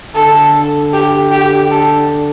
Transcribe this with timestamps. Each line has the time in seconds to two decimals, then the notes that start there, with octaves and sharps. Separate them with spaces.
0.15 D3 A4
0.93 G4
1.32 G4
1.71 A4